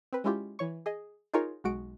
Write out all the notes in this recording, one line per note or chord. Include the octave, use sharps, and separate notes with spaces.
C4 B4
G#3 C#4 E4 F4 G4
E3 C#5 C#6
G#4 D#5
D#4 F4 G#4 A#4 C#5
B1 G#3 F#4 D7